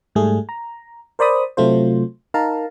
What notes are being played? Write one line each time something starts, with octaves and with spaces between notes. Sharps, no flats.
G#2 G3 A3 G#4
A#5
A#4 C5 D5 B5 D#6
C3 F#3 A3 F4 C5
D#4 A#4 F5 A5 A#5